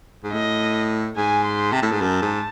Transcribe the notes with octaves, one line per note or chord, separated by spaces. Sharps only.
G#2
A2 D#5
G#2 G#5
C6
C3 A5
A2
G#2
F#2
G#2